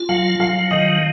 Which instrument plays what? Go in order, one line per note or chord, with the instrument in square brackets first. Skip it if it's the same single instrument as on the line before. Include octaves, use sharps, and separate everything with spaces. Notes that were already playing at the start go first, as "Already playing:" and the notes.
Already playing: [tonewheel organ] F4
[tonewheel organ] F#3 [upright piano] F5
[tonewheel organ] F#3 [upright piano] F5
[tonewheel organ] D#3 [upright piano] D#5